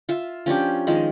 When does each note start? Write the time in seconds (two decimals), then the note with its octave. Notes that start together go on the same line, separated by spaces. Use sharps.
0.09 F4 E5
0.46 F3 C#4 D4 G4
0.87 D#3 F3 G#3